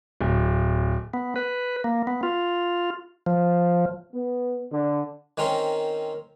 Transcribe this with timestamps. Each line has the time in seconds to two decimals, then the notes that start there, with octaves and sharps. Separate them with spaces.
0.21 D1
1.14 B3
1.36 B4
1.84 A#3
2.07 B3
2.23 F4
3.26 F3
4.13 B3
4.71 D3
5.37 D#3 C4 C#4 A#4 C6